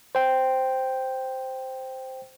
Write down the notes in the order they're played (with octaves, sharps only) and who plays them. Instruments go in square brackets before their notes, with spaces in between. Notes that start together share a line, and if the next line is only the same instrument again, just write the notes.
[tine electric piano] C5 G5